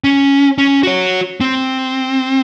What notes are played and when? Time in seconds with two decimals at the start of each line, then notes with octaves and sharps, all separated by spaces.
0.04 C#4
0.58 C#4
0.83 F#4 C#5
1.40 C4